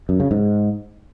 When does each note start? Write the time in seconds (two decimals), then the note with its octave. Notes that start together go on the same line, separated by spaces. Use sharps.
0.09 F#2
0.20 C#3
0.31 G#2